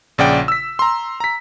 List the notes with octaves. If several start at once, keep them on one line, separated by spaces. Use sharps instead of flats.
A#1 C#3 D5 F#5 G5
E6 B6
A#5 C6
A#5 B6